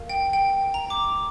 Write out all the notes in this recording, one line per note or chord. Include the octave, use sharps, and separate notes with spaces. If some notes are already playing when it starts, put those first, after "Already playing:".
Already playing: A#4 F5
G5
G5
A#5
D6